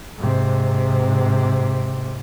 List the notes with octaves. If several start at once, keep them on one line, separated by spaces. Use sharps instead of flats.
G#2 C3